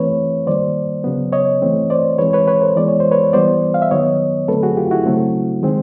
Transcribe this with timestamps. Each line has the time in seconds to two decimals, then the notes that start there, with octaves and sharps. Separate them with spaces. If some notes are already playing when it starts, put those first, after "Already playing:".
Already playing: E3 A3 C4 B4 C#5
0.47 D#3 G3 A#3 C5 D5
1.04 C#3 F#3 B3
1.33 C#5 D#5
1.62 E3 A3 C4
1.90 C5 D5
2.18 E3 G#3 C4 B4 C#5
2.33 B4 C#5
2.48 B4 C#5
2.62 A#4 C5
2.76 E3 G#3 B3 D5
2.88 C#5
3.00 C5
3.11 B4 C#5
3.33 E3 G3 B3 C5 D5
3.74 F5
3.82 E5
3.91 D#3 F#3 B3 C#5 D#5
4.48 D3 F#3 A3 C4 A4 B4
4.63 F#4 G#4
4.77 F4 G4
4.91 E4 F#4
5.06 C#3 F#3 A3 C4
5.63 D#3 G#3 C4